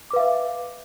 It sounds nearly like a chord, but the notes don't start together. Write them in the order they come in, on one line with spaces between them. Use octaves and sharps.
D6 B4 F5 E5